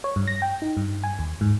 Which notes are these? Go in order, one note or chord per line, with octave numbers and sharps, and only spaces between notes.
C#5
G2
A#6
G5
D#4
G2
G#5
D#2
G#2